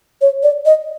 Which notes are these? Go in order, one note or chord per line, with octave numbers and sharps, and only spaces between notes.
C#5
D5
D#5